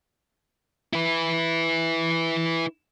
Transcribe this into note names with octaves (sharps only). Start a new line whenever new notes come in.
E4 B4